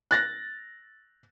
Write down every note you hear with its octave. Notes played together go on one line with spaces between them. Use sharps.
F#6 A6 A#6